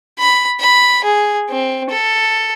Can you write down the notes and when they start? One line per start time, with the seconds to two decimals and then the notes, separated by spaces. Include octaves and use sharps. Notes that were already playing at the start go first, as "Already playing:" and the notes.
0.18 B5
0.60 B5
1.04 G#4
1.50 C4
1.90 A4